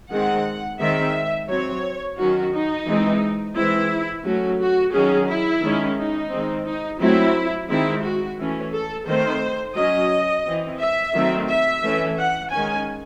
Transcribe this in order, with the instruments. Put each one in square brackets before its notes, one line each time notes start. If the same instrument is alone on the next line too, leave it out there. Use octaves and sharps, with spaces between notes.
[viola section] D#3 G#3 C4 F#5
D#3 G#3 C4 E5
F#3 C4 C#5
D#3 F#3 C#4 F#4
D#4
E3 G#3 C4
E3 G#3 C4 E4
F#3 A3 C#4 F#4
F#4
D#3 F#3 C#4 G#4
E4
D#3 G#3 C#4
D#4
D#3 G#3 C4
D#4
F#3 A3 C4 E4
D#3 G#3 C4 E4
F#4
E3 A3 C#4
A4
D#3 A3 C4 C5
F#3 C#4 D#5
E3 C4
E5
D#3 F#3 A3 C4
E5
E3 A3 C#4
F#5
D#3 G#3 C#4 G#5